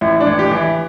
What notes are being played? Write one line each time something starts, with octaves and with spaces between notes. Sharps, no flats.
A1 E4
D4
A1
G4
E3
E4